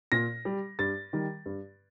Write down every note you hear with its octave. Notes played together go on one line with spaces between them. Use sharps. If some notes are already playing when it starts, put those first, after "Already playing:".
A#2 A#6
G3
G2 A6
D#3 G3
G2